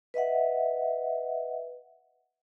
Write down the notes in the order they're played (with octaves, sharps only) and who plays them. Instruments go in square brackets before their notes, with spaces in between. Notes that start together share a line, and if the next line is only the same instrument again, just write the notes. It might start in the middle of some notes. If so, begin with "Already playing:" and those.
[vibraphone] B4 D#5 E5 F#5